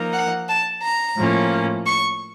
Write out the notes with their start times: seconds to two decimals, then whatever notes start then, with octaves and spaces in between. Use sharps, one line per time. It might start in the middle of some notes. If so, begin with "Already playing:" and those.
Already playing: F3 A#3 D#4 A#4
0.13 F#5
0.49 A5
0.82 A#5
1.17 A2 F3 A#3 C#4
1.86 C#6